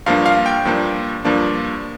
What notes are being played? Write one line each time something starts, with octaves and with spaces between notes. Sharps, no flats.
G2 F3 A#3 D4 F5
F5
G5
G2 F3 A#3 D4
G2 F3 A#3 D4